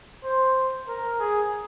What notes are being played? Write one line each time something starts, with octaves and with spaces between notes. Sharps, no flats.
C5
A#4
G#4